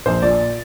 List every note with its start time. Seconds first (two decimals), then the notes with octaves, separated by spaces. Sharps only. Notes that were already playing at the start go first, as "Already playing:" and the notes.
0.06 A#1 C5
0.22 A#2 D5